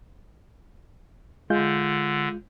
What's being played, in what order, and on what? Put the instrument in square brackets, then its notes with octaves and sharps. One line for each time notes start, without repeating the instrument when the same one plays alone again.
[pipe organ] D3 [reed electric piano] G#3 F4 G6